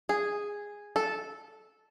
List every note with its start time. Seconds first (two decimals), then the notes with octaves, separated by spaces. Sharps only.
0.09 G#4
0.96 A4